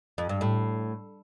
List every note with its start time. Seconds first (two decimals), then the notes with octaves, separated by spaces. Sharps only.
0.18 F2
0.29 G2
0.41 A2